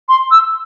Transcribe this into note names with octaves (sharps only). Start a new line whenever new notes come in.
C6
E6